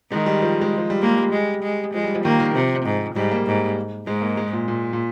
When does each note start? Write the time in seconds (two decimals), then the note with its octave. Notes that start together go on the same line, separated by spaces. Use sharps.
0.11 D#3 G#3
0.26 G3
0.42 F3
0.61 G#3
0.78 F3
0.90 G3
1.02 G#3 A#3
1.18 G3
1.33 G#3
1.63 G#3
1.94 F3 G#3
2.04 G3
2.15 F3
2.24 D#3 A#3
2.40 D#3
2.54 C3 F3
2.85 G#2
3.15 G#2 G3
3.31 A#3
3.46 G#2
4.07 G#2 G#3
4.22 A#3
4.37 G#3
4.53 A#2
4.68 A#2
4.93 A#2